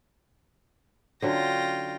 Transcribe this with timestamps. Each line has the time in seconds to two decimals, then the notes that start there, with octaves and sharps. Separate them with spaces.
1.22 D3 F#3 C#4 F4 G5 A#6